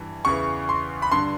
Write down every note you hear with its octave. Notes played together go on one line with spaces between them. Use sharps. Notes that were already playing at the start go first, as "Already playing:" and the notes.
Already playing: G2 E3
E2 C#3 E3 C#6
C6
B5
G2 D3 C6